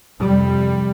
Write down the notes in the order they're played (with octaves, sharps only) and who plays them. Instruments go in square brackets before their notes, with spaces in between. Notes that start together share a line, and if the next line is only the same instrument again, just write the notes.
[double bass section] F2 C3 G3